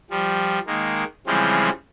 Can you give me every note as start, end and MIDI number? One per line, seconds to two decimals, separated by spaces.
0.10 0.59 53
0.10 0.59 55
0.67 1.04 51
0.67 1.04 56
0.67 1.04 58
1.27 1.70 49
1.27 1.70 52
1.27 1.70 53
1.27 1.70 55
1.27 1.70 56
1.27 1.70 60